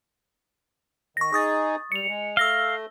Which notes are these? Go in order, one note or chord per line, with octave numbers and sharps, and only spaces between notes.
D#3 C#6 A#6
D#4 G#4 C#6 D#6 A6
G3 C#7 F7
G#3
A3 F5 E6 A#6 G7